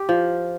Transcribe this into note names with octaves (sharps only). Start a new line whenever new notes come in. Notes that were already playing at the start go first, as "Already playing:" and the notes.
Already playing: G4
F3